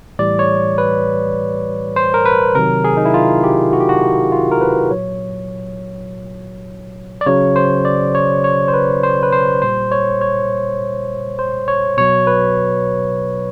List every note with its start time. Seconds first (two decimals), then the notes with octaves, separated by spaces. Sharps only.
0.19 A2 E3 G3 D5
0.39 C#5
0.78 B4
1.96 C5
2.14 A#4
2.26 B4
2.55 C3 D#3 F#3 A#4
2.84 G#4
2.97 D#4
3.05 E4
3.14 F4
3.43 G4
3.73 F#4
3.80 G4
3.89 F#4
4.32 F4
4.51 A#4
4.61 B4
4.90 A#2 F#3 C#5
7.21 D5
7.26 C#3 F#3 C#5
7.56 C5
7.85 D5
8.15 C#5
8.44 C#5
8.68 C5
8.74 B4
9.03 C5
9.23 B4
9.32 C5
9.62 A#2 G3 C5
9.91 C#5
10.21 C#5
11.39 C5
11.68 C#5
11.97 B2 F#3 C#5
12.27 B4